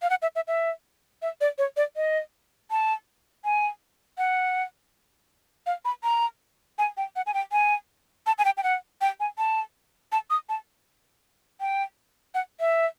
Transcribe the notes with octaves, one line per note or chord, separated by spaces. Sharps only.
F5
F#5
E5
E5
E5
E5
D5
C#5
D5
D#5
A5
G#5
F#5
F5
B5
A#5
G#5
G5
F#5
G#5
G5
G#5
A5
G#5
G5
G5
F#5
G5
G#5
A5
A5
D#6
A5
G5
F#5
E5